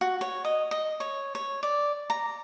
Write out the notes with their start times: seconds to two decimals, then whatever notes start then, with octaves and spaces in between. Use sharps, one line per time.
0.01 F#4
0.21 C#5
0.44 D#5
0.71 D#5
1.00 C#5
1.35 C#5
1.63 D5
2.10 A#5